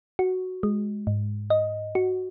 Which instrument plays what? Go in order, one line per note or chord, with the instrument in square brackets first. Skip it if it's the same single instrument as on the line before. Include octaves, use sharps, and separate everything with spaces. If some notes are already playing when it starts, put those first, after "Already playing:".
[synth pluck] F#4
G#3
G#2
D#5
F#4